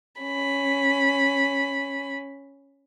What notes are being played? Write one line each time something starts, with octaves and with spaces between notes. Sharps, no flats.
C#4 B5